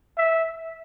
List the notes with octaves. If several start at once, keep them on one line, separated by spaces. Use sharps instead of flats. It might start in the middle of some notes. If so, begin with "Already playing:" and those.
E5